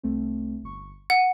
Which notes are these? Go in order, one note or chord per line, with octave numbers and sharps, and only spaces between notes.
C2 A3 C4
G1 C#6
F#5 D#7